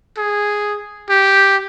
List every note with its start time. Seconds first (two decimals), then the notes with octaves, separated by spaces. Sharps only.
0.18 G#4
1.09 G4